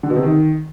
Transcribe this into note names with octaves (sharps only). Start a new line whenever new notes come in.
D3
B2
C3
D#3